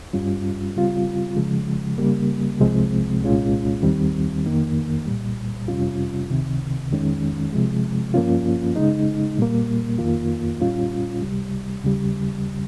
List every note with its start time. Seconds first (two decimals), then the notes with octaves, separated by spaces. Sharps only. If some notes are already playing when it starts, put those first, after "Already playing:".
0.13 G2 G3 C#4 F4
0.76 C#3 G3 C4 F4
1.37 C#3 F3 G#3
1.98 C#3 G3 A#3
2.60 C2 C3 F3 G#3 C4
3.22 C2 A#2 G#3 C#4 F4
3.83 D#2 D#3 G3 C4
4.45 F2 D#3 A#3
5.06 C2 A#2 G3
5.68 F2 C3 G3 C#4 F4
6.30 C#2 C3 D#3
6.91 F2 D#3 G#3 C#4
7.53 C3 F3 G#3
8.14 G2 F3 A#3 C#4 F4
8.76 C#3 G#3 D#4
9.38 A#2 G3 A#3
9.99 F2 D#3 A#3 F4
10.61 A#2 G3 C#4 F4
11.22 C#2 C3 G3
11.83 D#2 C#3 G3